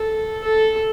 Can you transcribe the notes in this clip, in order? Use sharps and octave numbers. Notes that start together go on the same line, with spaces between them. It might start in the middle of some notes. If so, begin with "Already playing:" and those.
Already playing: A4
A4